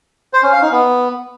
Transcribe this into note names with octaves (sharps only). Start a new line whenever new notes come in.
C5
C#4
F5
D#4
B3